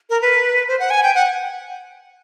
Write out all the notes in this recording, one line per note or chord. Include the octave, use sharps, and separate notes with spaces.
A#4
B4
C5
F#5
G#5
G5
F#5